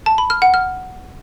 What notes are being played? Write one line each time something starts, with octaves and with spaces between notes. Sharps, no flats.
A5
B5
F6
F#5
F6